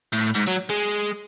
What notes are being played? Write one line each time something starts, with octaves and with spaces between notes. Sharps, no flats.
A2
G#2
F#3
G#3